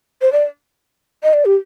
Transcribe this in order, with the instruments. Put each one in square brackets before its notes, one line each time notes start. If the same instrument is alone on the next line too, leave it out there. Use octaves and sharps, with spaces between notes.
[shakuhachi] C5
D5
D#5
D5
G4